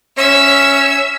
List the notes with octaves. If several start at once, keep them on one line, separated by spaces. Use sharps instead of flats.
C#4 E5 E6